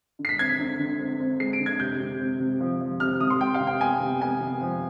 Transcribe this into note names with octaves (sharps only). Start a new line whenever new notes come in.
D3
C7
B6
C4 G#6
B6
D3
D3
C4
C4
G#3 C7
D7
D3
G#6
C3 G6
C3
C4
C3
F3
F3
C3 F6
C3 D#6
C6
C3 G5
F5
C3
G5
B3 G#5
C3
B3 G#5
C3
F3